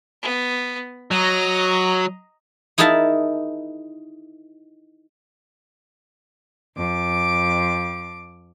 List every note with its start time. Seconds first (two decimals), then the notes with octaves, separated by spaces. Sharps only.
0.22 B3
1.11 F#3 D#5 A#5
2.78 D#4 E4 G#4 A#4 E5 A5
6.76 F2 D6